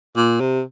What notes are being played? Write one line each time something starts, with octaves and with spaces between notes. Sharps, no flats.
A#2
C3